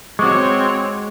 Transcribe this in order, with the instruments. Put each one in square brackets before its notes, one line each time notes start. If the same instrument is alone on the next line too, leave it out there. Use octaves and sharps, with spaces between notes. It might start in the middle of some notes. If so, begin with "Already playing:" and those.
[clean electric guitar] G#3 F#4 [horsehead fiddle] C4 C#5 [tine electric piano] C#6 D6